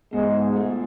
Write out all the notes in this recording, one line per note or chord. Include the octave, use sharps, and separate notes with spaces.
G#2 B2 G#3
A3